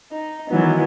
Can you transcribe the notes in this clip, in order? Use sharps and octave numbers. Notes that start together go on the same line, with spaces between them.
D#4
D#3 E3 F#3 B3